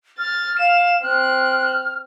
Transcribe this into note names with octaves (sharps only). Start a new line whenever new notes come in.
F6 A6
F5 E7
C4 F6 F#6